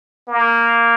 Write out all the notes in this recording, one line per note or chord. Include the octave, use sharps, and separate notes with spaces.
A#3